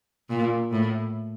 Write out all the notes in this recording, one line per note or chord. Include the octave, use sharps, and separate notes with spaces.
A#2
A2